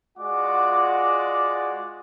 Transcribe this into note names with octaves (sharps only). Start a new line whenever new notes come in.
G#3 F4 F#4 D5 F#5 D6